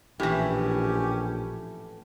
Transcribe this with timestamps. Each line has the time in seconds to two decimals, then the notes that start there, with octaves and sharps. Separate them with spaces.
0.20 A#1 A2 E3 C#4 G4